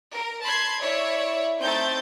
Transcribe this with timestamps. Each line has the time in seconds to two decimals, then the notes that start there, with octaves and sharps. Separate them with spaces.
0.12 A#4
0.42 A5 B5 C6 G#6 C7
0.80 E4 C#5 D5 E5
1.60 A3 C4 D#4 G6 A6